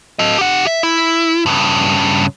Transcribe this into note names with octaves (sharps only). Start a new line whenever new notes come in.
A4 D#5
G4 F#5
E5
E4
G2 C#3